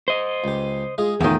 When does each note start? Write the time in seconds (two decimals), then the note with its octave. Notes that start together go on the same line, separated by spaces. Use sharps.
0.08 C5 D#5
0.44 C#2 G4
0.98 G#3 F4 G#4 D#5
1.20 E2 A2 D#3 F4 D#6